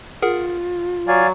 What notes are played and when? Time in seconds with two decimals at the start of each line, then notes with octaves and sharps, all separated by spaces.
0.22 F4 G#4 A#4 F#5
1.08 F#3 D5 F5 G#5